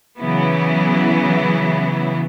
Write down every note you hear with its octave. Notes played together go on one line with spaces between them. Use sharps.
C#3 E3 F#3 B3 E4